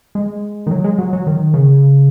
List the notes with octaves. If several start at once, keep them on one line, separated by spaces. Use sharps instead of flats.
G#3
D#3
F#3
G#3
F#3
F#3
D#3
C#3